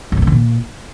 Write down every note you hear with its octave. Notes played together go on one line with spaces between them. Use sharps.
F#2
B2
A#2
D#3
A#2